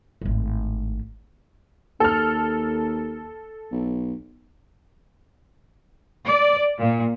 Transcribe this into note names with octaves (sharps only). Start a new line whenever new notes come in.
G#1 A2
D#2 A4 F6
B1
D5
A#2